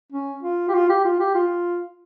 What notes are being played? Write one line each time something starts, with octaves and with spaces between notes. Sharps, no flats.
C#4
F4
G4
F4
G4
F4
G4
F4